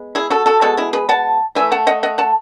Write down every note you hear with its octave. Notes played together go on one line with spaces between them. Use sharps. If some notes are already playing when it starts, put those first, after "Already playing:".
Already playing: G#3 B3
E4 G#4
F#4 A4
F#4 A4
B2 G#3 B3 F#4 A4
E4 G#4
G#4 B4
F#5 A5
E3 A3 E5 G#5
F#5 A5
D#5 F#5
D#5 F#5
F#5 A5